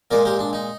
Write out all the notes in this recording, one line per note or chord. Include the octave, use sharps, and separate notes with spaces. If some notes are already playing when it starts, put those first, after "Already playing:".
A#2 G#3 A#4 D5
G4 A#4
D4
D#4